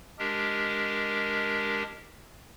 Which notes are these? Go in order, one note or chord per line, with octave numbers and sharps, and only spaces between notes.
G#3 D4 G4 A#4